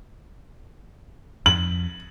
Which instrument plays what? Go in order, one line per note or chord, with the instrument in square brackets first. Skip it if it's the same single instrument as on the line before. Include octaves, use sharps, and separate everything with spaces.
[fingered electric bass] F2 [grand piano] F#7